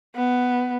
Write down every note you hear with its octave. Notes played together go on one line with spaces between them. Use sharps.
B3